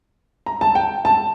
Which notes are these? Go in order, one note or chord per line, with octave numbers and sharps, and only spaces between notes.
A#5
A5
G5
A5